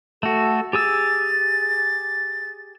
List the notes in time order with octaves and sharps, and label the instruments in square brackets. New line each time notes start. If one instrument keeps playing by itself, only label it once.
[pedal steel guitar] A3 F#4 [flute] A4
[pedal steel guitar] G4 G#4 E6 [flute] A6